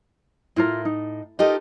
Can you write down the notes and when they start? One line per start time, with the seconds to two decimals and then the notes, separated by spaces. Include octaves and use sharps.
0.56 A2 E4 F4 A#4
0.85 D#4
1.39 D#4 F4 G4 A4 A#4 D#5